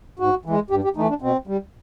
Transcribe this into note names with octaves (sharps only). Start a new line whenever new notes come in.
G#2 F#4
E3 G#3
G2 G4
G4
E3 A3 D#4
D4
B2 C4
G3